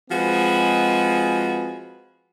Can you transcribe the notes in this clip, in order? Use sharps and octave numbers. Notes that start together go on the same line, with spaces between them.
F3 G#3 C4 F#4 G#4 B4